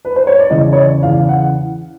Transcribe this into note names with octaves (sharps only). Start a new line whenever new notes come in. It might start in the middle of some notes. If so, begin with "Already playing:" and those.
B4
C5
C#5
D5
E2 C#3 E3 D#5
C#5
D5
E2 C#3 E3 F5
F#5